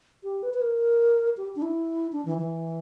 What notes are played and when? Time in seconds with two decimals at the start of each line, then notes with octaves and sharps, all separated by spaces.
0.24 G4
0.43 B4
0.54 B4
0.62 A#4
1.37 G4
1.56 D4
1.62 E4
2.12 D4
2.25 E3
2.38 E3